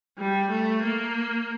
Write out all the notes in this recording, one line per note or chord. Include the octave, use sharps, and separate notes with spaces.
G3
A3
A#3